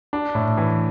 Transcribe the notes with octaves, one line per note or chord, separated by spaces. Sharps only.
D4
A2
E3